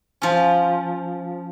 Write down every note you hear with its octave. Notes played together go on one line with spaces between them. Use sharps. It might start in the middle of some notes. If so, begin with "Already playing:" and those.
F3 C#4